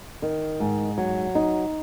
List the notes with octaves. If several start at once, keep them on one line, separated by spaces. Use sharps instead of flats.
D#3
G#2
F#3
D#4